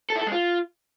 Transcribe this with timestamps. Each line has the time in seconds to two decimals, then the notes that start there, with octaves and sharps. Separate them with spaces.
0.10 A4
0.16 E4
0.21 A4
0.27 G#3
0.32 F4